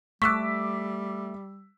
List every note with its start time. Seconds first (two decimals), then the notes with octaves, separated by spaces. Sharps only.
0.22 G3 A3 C#6 D6 E6 F#6 B6